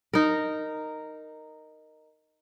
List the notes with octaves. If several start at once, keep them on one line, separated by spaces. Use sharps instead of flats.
D#4 A#4